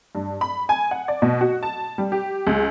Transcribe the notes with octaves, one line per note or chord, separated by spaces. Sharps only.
G2
B5
G#5
F#5
D5
B2
F#4
A5
G3
G4
C#2